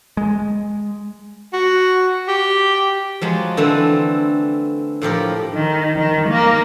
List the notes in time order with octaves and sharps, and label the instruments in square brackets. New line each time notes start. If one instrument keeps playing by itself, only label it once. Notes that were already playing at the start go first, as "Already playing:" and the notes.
[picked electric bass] G#3
[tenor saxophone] F#4
G4
[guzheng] F3 F#3 G#3
D3 E3 A3 C4
A2 F3 G4 A#4
[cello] D#3
D#3
A#3